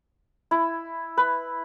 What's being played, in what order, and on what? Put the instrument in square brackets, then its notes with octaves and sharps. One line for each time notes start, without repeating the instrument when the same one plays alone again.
[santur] E4
B4